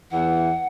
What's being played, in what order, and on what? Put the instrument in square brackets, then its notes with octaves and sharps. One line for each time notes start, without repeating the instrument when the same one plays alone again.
[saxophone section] E2 E3 [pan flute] F#5